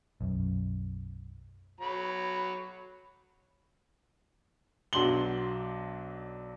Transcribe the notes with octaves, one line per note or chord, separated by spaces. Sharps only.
B1 F#2
F#3 B5
B1 F#3 D4 C6 F#7 G7